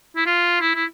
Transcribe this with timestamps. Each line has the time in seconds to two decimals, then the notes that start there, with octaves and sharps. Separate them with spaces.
0.16 E4
0.26 F4
0.61 E4
0.75 E4